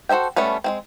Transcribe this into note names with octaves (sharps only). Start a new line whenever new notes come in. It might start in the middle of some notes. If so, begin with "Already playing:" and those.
F#4 A4 C5 E5 G5
G3 A3 B3 C#4 B4
G#3 A#3 C4